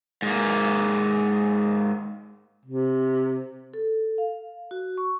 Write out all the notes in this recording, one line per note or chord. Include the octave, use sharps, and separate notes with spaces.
G#2 A#3
C3
A4
F5
F#4
C#6